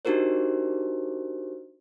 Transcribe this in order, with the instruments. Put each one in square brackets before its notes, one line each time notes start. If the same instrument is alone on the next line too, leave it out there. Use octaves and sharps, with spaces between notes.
[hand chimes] D4 D#4 F#4 G4 A#4 C5